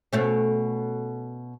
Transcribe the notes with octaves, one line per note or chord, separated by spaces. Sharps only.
B2 A3 C#4